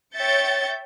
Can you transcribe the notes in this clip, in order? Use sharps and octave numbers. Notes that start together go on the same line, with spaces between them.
C#5 E5 G5 G6 A6 C#7